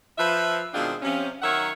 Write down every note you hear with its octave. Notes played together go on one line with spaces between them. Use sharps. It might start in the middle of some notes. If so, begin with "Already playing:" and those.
F3 B4 E5
B2 D#3 G#3 C4 D4 F4
C3 F3 C#4
D#3 F#3 A#4 C#5 E5 F#5